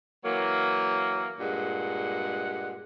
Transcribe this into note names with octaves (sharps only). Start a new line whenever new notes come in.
E3 F#3 A#3
G2 A#2 G#3 F#5